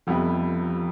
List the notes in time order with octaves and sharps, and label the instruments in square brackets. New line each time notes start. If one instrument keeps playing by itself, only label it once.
[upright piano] F1 F2 C3 G3 B3 [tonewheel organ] F3